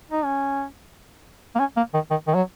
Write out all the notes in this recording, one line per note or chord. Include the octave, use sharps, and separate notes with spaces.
D#4
C#4
A#3
C#4
A#3
D#3
D#3
D#3
F#3